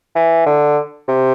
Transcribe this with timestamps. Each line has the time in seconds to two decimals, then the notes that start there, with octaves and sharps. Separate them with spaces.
0.15 E3
0.46 D3
1.08 C3